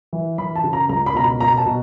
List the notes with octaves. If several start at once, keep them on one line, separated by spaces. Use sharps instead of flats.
E3
E3 B5
A5
C#3
A#5
C#2 A#5
B5
B2 A#5
B5
B2 A#5
A5
B2